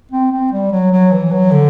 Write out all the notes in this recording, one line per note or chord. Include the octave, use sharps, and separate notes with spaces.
C4
C4
G3
F#3
F#3
E3
F#3
D3